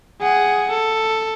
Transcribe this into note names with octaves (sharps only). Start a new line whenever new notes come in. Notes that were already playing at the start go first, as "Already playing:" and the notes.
G#4 F#5
A4